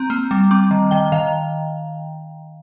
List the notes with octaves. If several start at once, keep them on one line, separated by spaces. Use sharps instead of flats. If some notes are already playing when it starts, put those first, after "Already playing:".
Already playing: C4 A#5
A#3
G3
C4 D6
D#3
D#3 G5
D#3 F5